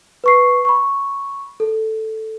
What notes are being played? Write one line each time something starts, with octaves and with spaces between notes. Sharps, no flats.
B4 C#6 C7
B5 C#6
A4